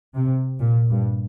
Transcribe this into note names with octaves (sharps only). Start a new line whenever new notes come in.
C3
A#2
G2